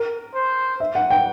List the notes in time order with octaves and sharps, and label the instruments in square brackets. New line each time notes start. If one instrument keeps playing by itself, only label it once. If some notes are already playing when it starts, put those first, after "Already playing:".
Already playing: [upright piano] A#4
[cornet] C5
[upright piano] E5
F#5
G5